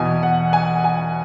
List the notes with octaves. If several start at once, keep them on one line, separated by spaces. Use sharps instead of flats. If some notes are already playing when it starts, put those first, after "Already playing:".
Already playing: E2 B2 G#5
F#5
G#5
G#5